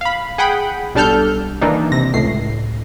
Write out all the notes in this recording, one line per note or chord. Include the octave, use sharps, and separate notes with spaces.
F5 B5
G#4 F#5 G5 B5
B1 G3 D4 A4 F6 G6
D#3 E3 A#3 D4 D#4
C3 A#6
C#2 A2 C7